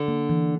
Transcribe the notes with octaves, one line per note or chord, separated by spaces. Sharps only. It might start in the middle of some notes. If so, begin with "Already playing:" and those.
Already playing: D3
A#3
E3